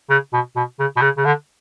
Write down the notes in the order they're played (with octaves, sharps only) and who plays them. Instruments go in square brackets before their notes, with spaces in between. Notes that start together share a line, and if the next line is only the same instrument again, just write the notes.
[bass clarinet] C#3
B2
B2
C#3
B2
C#3
C#3
D3